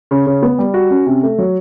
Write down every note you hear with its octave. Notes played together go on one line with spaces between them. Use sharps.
C#3
C#3
B3
G3
F#4
C#4
C3
A3
F#3